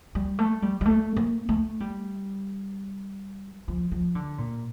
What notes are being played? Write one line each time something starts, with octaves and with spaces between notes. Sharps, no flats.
G3
A3
G3
G3
A3
A#3
A3
G3
F3
F3
D3
A#2